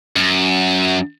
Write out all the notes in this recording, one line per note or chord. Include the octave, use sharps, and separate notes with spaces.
F#2